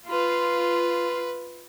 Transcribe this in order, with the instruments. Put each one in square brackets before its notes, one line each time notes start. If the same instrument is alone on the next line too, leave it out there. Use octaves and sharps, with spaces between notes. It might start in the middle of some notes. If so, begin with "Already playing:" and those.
[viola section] F4 [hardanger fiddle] B4